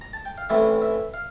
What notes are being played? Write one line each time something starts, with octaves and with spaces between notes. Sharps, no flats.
A#5
A5
G5
F5
A1 A2 E3 A3 C4 E5
E5
F5